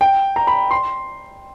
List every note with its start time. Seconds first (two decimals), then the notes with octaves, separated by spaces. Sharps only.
0.01 G5
0.36 A#5
0.47 B5
0.71 C6